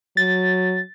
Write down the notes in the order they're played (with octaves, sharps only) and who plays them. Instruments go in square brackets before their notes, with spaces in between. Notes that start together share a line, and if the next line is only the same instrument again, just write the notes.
[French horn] F#3 [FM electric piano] A6